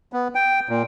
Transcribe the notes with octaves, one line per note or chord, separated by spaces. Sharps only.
B3
G5
A#2